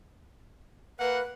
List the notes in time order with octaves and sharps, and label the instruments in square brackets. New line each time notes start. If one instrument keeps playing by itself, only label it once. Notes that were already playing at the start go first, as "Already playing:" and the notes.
[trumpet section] A#3 F#5 [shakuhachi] B4